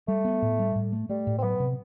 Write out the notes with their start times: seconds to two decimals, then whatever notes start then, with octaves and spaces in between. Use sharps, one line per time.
0.08 G3 A3
0.25 B3
0.42 A2
0.59 G3
0.76 A2
0.93 A3
1.09 G3 A3
1.27 A2
1.38 C4
1.43 F#3 B3
1.60 C3